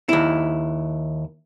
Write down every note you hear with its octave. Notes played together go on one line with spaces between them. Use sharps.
D#2 E4